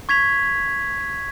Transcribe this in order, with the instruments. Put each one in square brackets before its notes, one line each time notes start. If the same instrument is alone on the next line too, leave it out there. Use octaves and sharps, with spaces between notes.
[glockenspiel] C#6 G#6 B6 F7